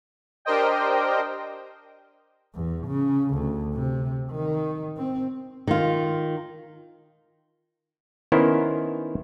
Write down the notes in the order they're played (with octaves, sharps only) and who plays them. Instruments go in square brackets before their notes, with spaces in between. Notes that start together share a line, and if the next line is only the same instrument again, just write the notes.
[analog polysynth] D4 G4 A#4 C5 D#5 G5
[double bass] E2
C#3
D2
C3
D#3
C4
[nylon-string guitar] D#3 F4
[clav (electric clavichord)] D#3 B3 C#4 E4 A#4 C5